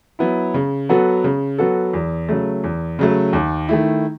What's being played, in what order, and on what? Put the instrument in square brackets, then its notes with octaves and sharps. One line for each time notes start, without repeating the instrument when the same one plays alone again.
[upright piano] F#3 B3 E4
C#3
F#3 B3 F#4 A4
C#3
F#3 B3 F#4 A4
E2
C#3 F#3 A3
E2
C#3 F#3 A3
D#2
D#3 A3 E4